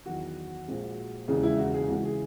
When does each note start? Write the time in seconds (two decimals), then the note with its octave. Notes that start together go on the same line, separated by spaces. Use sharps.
0.06 E2 D#3 F#3 F#4
0.68 A#1 A#2 G#3
1.28 E1 D#2 C#3 E3 G#3
1.43 E4
1.59 F#4
1.74 G#4
1.89 C#2 C#3 E3 G#3 F#4
2.05 G#4